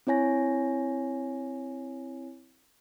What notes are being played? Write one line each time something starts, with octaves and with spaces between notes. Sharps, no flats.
C4 E4 C#5 G#5 A#6